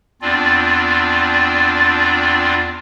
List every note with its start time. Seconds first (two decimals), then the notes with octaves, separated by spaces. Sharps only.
0.22 E2 C4 D4 F4 D5